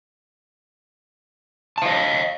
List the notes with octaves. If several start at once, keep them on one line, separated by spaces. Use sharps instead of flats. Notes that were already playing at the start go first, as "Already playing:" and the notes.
D#5 F5 A5